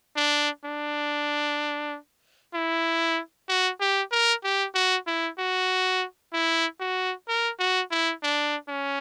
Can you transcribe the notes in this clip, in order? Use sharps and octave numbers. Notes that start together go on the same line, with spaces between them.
D4
D4
E4
F#4
G4
A#4
G4
F#4
E4
F#4
E4
F#4
A#4
F#4
E4
D4
C#4